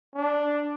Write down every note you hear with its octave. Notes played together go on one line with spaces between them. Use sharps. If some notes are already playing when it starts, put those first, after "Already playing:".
D4